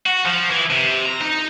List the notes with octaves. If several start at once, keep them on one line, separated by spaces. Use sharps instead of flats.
F#4
F3
E3
C3
A#5
D#4